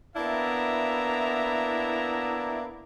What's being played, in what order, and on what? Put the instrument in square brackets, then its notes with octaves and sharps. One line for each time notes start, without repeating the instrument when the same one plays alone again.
[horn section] A#3 B3 D4 E4 E5 A#5